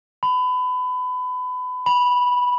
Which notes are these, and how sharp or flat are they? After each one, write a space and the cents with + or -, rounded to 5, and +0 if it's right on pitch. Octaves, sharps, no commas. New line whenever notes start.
B5 +25
B5 -5